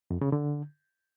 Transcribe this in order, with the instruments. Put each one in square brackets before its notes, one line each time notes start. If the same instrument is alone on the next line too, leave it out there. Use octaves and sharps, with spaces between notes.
[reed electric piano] F2
C#3
D3